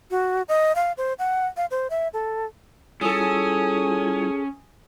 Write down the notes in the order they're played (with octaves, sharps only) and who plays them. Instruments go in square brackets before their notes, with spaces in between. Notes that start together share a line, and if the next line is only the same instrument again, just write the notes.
[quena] F#4
D#5
F5
C5
F#5
F5
C5
E5
A4
[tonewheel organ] G3 E4 F4 [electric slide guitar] C#4 [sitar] G#4 A4 [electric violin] G#5 D#6